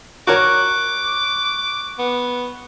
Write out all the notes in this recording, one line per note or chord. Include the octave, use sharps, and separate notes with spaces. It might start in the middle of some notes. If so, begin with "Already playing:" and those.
F#4 A#4 C#5 C#6 D6 F#6
B3